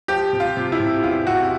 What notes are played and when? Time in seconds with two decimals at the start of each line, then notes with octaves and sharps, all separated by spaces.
0.08 F3 G4
0.33 C3
0.40 F4
0.57 C3
0.72 E4
0.80 C3
1.03 E2 F4
1.27 C3 F#4